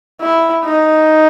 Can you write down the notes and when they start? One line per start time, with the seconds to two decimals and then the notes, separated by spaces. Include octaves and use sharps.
0.21 E4
0.65 D#4